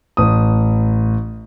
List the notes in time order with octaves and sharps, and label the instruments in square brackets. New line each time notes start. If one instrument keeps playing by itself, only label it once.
[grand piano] A1 D#6